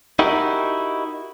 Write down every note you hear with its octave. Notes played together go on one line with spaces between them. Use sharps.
D#4 E4 F#4 G4 A#4